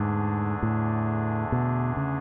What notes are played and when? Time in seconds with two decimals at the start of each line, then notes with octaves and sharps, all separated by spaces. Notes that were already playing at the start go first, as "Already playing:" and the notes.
Already playing: E2 G#2 D3 A3 D4 G#4
0.63 A2
1.52 B2
1.97 C#3